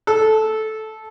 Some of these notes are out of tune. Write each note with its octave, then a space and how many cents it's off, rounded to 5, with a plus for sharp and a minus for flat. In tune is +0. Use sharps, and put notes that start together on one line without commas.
A4 -10